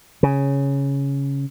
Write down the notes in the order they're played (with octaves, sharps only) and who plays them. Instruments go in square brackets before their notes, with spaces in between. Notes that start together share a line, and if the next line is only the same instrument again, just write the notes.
[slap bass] C#3